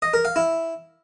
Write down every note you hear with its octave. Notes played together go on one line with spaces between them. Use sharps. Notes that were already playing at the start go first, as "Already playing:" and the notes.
D#5
A#4
F5
E4